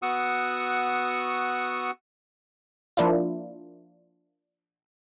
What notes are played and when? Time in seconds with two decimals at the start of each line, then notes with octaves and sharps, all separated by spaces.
0.02 B3 F#4 F#5 C#6 D#6 E6
2.97 F3 A#3 D4 E4 F4